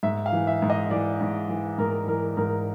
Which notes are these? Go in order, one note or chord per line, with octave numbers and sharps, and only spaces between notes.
G#2 E5
F5
E3
E5
G#2
D#5
E3 D5
G#2
E3
G#2 A#4
E3 A#4
G#2 A#4